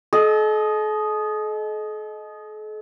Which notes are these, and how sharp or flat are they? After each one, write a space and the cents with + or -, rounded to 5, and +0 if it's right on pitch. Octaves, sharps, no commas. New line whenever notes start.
A4 -45 D#5 +0